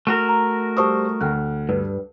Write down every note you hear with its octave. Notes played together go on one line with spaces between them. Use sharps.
A3 F#4 A#4
A#5
G3 C5 A5 C#6 D#6 E6
D2 G5 F6 F#6
G2 B4